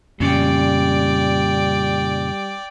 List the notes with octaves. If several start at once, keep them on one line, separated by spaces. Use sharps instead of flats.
F2 A#2 C#3 G3 C#4 D5 G5